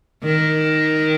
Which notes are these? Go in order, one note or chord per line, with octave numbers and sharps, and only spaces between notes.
D#3